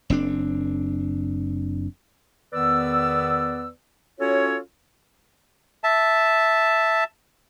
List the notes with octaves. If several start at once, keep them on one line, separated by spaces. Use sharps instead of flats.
F#1 C4 D4
E2 D#3 B3 B4 D5 E6
C#4 F4 F#4 A4 C#5
E5 A5